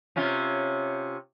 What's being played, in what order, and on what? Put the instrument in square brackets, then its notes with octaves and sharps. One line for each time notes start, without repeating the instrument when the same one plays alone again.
[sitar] C3 C#4 F4